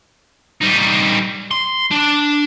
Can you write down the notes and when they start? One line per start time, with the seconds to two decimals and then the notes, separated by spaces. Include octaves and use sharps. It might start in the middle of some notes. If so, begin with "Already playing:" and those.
0.61 G3 D#4
1.51 C6
1.91 D4